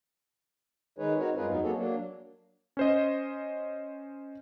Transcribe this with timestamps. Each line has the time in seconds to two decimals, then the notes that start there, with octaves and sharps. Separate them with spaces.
0.99 D#3 G#3 D#4 G#4 B4 C#5
1.19 C4 D#4 F#4 A#4 C#5
1.36 G2 G#3 F4 G#4 A#4 B4
1.48 F2 F#3 B3 D#4
1.62 A#3 B3 F#4 G#4 A4 C#5
1.76 F#3 A#3 D4
2.77 C#4 C5 D#5